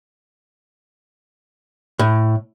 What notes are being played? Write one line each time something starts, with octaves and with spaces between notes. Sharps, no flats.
A2